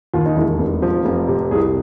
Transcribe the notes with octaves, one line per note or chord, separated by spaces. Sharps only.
D#2 F4
D#4
E1 E4
F1
F3
F1
C3
C2 G#4